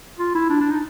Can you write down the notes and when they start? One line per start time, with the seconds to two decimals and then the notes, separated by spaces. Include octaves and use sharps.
0.19 F4
0.35 E4
0.50 D4
0.61 D4
0.71 D#4